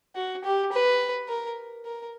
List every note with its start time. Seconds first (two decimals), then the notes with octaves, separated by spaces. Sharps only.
0.16 F#4
0.44 G4
0.72 B4
1.28 A#4
1.85 A#4